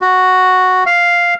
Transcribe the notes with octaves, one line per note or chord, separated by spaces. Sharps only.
F#4
F5